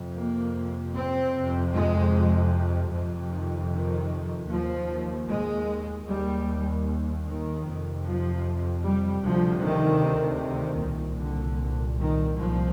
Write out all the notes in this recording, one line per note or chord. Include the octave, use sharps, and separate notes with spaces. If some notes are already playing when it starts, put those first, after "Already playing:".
Already playing: F2 C3
A#3
C4
F2 C3
G#3
F2 C3
D#3
D#3
D#2 F3
G#3
D#2 G3
D#3
F2 C3
F3
G3
D2 C3 F3
D#3
D#3
C2 A#2
D3
D#3
C2 A#2 F3